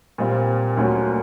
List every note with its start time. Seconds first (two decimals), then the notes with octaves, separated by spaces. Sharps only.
0.18 A#2 G3 C4 F4
0.77 D2 D3 F#3 A#3 C#4